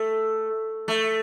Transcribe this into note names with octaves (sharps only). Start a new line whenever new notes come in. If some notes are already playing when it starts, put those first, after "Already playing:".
Already playing: A3
A3